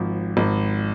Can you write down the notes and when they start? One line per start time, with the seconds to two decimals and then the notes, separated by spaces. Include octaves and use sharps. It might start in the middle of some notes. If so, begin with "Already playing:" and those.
Already playing: G#1 F3
0.37 G#1